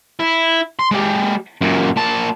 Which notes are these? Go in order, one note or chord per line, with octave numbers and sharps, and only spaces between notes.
E4
C6
G#3 G4
F#2 A#2
A#2 A5